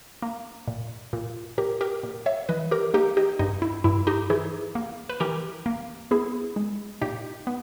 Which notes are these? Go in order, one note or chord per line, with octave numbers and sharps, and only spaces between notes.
A#3
A#2
A#2
A#2 G4 A#4
G4 A#4
A#2
C#5 E5
E3 B4 D#5
G4 A#4
A#3 D#4 G4
D#4 G4
G2 D#4
E4
G2 E4
D#4 G4
E3 E4 G#4
A#3
B4
E3 G4 A#4
A#3
B3 E4 G#4
G#3
A#2 D#4 G4
B3